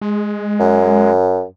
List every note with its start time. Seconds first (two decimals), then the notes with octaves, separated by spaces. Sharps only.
0.01 G#3
0.60 F#2